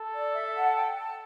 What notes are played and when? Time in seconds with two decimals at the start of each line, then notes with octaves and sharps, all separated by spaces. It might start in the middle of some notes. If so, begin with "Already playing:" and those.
Already playing: A4
0.14 D5
0.34 E5
0.55 F#5
0.76 G5
0.96 A5